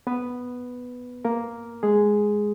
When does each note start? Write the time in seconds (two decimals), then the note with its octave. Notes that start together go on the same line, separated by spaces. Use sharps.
0.07 B3 B4
1.25 A#3 A#4
1.83 G#3 G#4